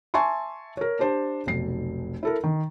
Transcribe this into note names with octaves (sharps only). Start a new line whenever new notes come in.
E5 G#5 A5 C6 C#6
A#4 C#5
D4 G4 C5 A5
F1 B1 B2 C7
E4 A4 A#4
D#3